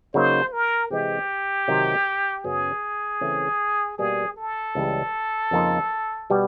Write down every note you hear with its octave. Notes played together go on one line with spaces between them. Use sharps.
C#3 F#3 A#3 D#4 C5
A#4
C3 E3 G#3 C4 G4
C3 D#3 F#3
F#2 C#3 F#3 B3 G#4
C#3 E3 A3 C4
B2 G3 A#3 G#4
A4
C#2 C#3 E3 G3
F2 C#3 F3 A#3 D#4
B2 G3 B3